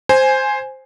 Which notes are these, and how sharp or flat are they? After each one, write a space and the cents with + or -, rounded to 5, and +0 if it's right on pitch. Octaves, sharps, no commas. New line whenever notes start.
C5 +0 G#5 +0